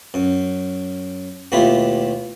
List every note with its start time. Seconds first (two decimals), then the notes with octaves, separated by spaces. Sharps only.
0.14 F#2
1.52 D#2 B2 A3 E4 F4 G4